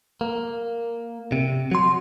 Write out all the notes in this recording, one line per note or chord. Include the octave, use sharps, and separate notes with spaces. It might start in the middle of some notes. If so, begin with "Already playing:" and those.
A#3
C3
F#3 C6